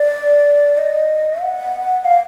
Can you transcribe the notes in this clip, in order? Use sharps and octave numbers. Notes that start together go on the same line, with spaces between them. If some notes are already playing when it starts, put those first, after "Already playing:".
Already playing: D5
D#5
F#5
F5